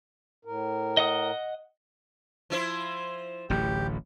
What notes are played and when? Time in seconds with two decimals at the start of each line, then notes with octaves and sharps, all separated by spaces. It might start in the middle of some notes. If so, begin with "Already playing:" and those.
0.45 A2 A#4
0.97 D#5 F#5 D#6
2.50 F3 E4 C5
3.50 D1 A1 A2 G4